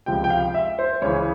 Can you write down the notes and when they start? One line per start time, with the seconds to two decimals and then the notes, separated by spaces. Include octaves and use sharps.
0.06 C#2 C3 F3 G5
0.24 G5
0.30 F5
0.54 E5
0.79 C5
1.02 C#2 C#3 E3 C#5